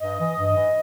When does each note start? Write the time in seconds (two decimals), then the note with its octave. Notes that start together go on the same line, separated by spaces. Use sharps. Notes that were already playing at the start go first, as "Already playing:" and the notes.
0.01 G2 D#5
0.19 E3
0.39 G2
0.56 E3